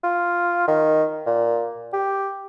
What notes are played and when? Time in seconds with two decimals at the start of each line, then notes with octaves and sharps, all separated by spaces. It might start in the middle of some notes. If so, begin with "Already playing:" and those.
0.04 F4
0.68 D#3
1.26 A#2
1.93 G4